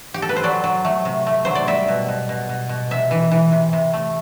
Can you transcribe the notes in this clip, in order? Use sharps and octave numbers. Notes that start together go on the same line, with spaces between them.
G4
A4
B4
C5
F#3 D5
F#3
A3
C3
A3
F#3 C5
D5
G3 E5
B2
B2
B2
B2
B2
C3 E5
E3
E3
C3
C3
A3